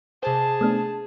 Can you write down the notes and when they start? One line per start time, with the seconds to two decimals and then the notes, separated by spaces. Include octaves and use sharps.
0.23 C3 G#4 C5 A5
0.61 A3 B3 D4